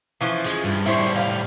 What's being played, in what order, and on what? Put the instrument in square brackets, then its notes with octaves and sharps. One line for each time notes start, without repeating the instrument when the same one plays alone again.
[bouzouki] E3 F3 C#4
[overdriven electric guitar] G#3
G2
[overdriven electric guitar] A2 G3 [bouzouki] E4 C5 C#5
[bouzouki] F5